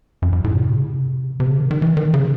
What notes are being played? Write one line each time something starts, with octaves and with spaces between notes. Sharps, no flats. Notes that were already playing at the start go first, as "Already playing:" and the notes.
F#2
F#2
A2
C3
C#3
C3
C3
C#3
D#3
D#3
E3
D#3
C#3